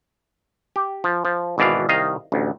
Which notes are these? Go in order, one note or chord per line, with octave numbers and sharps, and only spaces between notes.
G4
F3
F3
G#1 B2 E3 D5 F5
C2 D#3 D#5 F5
A1 D2